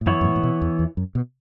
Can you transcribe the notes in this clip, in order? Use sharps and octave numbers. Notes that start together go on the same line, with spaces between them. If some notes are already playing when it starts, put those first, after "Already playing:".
A2
F#2 E3 B3 E4 C#5
F#2
A2
A2
B2
E2
E2
F#2
B2